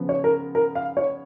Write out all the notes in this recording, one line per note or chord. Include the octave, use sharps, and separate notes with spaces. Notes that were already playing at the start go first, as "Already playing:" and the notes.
Already playing: C#3 F3 B3
C#5
A#4
A#4
F5
C#5